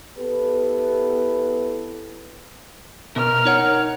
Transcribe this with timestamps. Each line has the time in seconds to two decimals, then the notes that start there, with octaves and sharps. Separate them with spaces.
0.17 B3 E4 G4 A4 B4
3.16 B2 A#4 F6
3.45 D#4 C#5 F#5